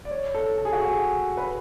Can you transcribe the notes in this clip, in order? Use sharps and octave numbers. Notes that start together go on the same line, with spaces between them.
D5
C#5
A4
A4
G#4
F#4
G#4
B4